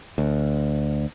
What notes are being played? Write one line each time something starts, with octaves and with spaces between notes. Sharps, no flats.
D2